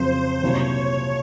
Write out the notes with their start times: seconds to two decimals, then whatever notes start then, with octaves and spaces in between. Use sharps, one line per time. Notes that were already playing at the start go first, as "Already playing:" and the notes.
Already playing: F2 C#3 F#3 C4 C5
0.42 C2 A#2 F#3 C#5